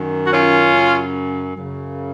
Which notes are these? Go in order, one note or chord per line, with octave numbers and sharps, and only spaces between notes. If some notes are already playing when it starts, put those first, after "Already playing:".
Already playing: F#2 D#3
F#4
C#4 F4
F#2 C#3
F#2 C#3